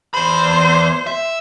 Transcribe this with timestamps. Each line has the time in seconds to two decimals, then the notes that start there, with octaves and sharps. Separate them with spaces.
0.14 E2 C5 B5
1.07 E5